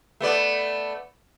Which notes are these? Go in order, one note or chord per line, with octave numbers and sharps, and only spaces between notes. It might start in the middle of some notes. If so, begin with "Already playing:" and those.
A3 B3 D5